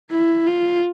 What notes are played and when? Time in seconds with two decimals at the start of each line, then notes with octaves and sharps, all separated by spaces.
0.11 E4
0.47 F4